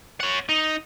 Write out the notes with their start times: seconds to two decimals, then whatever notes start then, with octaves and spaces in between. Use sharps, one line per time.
0.20 C#4 F#5
0.49 D#4